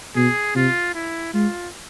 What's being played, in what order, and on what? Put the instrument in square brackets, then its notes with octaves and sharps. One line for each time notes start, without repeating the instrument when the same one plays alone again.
[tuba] B2 [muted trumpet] G#4
[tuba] C3 [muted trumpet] F4
[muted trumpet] E4
[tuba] G#3 [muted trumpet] F4